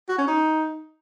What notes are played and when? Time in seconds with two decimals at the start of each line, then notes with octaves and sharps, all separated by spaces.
0.09 F#4
0.18 C#4
0.28 D#4